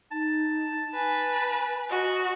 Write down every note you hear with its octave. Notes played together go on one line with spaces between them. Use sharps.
D#4 A5
B4 G#5
F#4 D#5